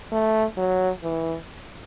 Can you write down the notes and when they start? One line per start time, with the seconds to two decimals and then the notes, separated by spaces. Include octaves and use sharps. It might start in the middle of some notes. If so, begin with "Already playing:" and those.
0.12 A3
0.58 F#3
1.04 E3